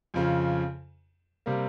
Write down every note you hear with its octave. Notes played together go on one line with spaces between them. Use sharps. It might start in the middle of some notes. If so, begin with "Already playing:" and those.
F2 C#3 F3
C3 G3 A#3